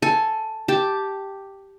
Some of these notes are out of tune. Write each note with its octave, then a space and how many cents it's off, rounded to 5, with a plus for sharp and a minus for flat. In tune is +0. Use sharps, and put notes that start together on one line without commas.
A4 +0 G#5 +20
G4 +0 A5 +0